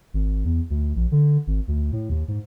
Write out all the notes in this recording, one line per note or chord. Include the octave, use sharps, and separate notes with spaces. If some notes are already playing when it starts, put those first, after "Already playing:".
G#1
E2
D2
A#1
D3
G#1
D2
A2
D#2
G#2